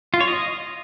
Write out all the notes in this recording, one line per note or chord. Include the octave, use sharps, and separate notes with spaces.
F4
C#5
D#5